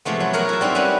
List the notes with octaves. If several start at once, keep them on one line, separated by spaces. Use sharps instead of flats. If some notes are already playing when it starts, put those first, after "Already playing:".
C3 F3 G#3 A3 B3
F#3
G#4 A#4 C#5 F#5 G#5
E4 A5
G3 C4 D#4 E4
G3 C#4 F#4 B4